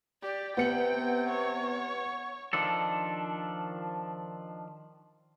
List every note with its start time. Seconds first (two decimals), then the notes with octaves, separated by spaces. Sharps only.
0.23 G4 D5
0.57 C3 B3 F#5 G5 C#7 F#7
1.29 C#5
2.53 D#3 F3 D4 A4